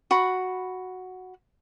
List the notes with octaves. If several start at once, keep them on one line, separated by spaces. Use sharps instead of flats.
F#4 B5